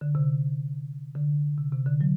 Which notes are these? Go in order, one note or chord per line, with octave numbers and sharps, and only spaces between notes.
D3
C3
D3
C3
C3
D3
F#3